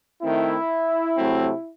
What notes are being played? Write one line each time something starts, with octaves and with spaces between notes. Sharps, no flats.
D#3 A3 C4 E4
C3 F#3 A3 C4